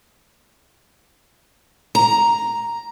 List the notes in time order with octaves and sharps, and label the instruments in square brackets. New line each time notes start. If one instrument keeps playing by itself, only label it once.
[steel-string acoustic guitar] A#5